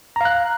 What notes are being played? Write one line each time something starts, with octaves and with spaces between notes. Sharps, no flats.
F5 A#5 F#6